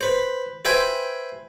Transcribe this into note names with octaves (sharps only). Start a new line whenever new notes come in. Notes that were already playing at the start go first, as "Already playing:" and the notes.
B4 C5
B4 C5 E5 G5 G#5 C6